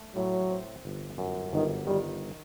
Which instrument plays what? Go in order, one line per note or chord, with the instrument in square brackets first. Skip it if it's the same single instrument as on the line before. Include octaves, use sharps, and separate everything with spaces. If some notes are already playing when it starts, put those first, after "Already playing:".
Already playing: [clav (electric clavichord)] A3
[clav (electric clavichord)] A2 [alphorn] F#3
[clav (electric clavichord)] C4
G1
F#2
[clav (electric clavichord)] G1 [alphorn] D#3
[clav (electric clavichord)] D#3 [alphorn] G3